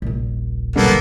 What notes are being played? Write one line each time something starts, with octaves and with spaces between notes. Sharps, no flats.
D#1 A#1
B1 G2 D3 A#3 B3 A4